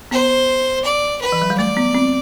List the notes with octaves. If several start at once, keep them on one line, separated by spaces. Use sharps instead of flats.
B3 C5
D5
B4
E3
F#3
G3
A3 D5
B3
C4